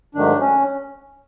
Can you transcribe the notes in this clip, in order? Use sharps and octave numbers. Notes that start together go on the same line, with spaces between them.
G#2 D#3 F#3 A3 D4
C#4